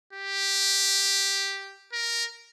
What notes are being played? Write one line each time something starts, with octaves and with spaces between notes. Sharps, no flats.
G4
A#4